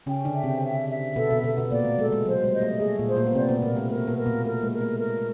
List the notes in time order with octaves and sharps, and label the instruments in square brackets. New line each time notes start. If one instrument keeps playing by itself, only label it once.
[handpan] C#3 C#4 [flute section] G5
[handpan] D3 D4
[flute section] E5
[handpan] C3 C4
[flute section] E5
E5
[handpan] B2 B3 [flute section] A4
[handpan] B2 B3
[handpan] B2 B3 [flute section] A4
[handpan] B2 B3
[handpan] A#2 A#3 [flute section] D5
[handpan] A3
[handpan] G#3 [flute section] A4
[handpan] G#3
[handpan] F#3 [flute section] C5
[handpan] G3
[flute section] D#5
[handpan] A3
[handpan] A3 [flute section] G#4
[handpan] A#2 A#3
[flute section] C5
[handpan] A#2 A#3
B3
[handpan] C3 C4 [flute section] D5
[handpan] B2 B3
[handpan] A#2 A#3 [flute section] A#4
[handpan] A3
[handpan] A3 [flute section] A#4
[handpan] B2 B3
[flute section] A#4
[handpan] A#2 A#3
[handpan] A3 [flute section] A#4
[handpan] G#3
[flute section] A#4
[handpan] A3
[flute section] A#4